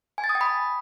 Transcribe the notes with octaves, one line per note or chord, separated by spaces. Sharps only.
G#5
A6
D#6
G5
B5